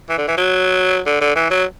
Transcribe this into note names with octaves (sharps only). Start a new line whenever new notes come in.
E3
D3
E3
F#3
D3
D3
E3
F#3